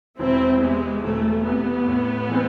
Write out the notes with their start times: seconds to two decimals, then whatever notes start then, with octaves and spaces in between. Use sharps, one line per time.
0.18 E1 C4 E4
0.61 E2 C3 G#3
1.03 E1 A3
1.45 E2 C3 B3
1.88 A2
2.29 E3 G#3 C4